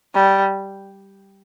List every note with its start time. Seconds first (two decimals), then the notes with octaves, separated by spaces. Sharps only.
0.14 G3